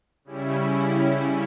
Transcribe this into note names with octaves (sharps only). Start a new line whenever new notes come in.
C#3 G3 C#4 E4